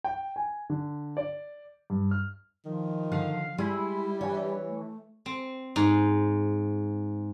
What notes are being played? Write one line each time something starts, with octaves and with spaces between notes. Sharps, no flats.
G5
G#5
D3
D5
G2
F6
D#3 F3
D3 F5
G3 G#3 E4
E3 D4 C#5
A3
C4
G#2